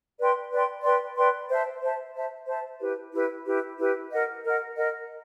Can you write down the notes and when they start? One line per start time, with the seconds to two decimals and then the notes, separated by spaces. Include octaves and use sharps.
0.19 B4 D5 G5 C6
0.51 B4 D5 G5 C6
0.83 B4 D5 G5 C6
1.16 B4 D5 G5 C6
1.49 C5 E5 A5
1.81 C5 E5 A5
2.14 C5 E5 A5
2.47 C5 E5 A5
2.80 E4 G4 B4
3.13 E4 G4 B4
3.45 E4 G4 B4
3.78 E4 G4 B4
4.11 A#4 D#5 F#5
4.43 A#4 D#5 F#5
4.76 A#4 D#5 F#5